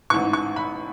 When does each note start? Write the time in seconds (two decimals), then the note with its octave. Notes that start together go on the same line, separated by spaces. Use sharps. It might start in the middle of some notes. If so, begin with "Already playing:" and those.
0.10 A1 G#2 E3 C#6
0.33 C#6
0.56 B5